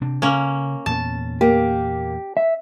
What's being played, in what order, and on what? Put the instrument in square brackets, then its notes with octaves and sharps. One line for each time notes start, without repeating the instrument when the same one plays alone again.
[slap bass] C3 C4 D4
[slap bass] C#3 [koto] A#3 C#4
[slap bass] E2 A#2 B3 [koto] A5
[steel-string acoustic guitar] A#3 [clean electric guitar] G4
[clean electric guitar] E5